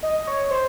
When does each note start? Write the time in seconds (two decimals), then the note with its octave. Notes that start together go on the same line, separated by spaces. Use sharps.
0.03 D#5
0.27 C#5
0.51 C5